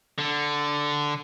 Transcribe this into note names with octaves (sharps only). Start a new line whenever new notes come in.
D3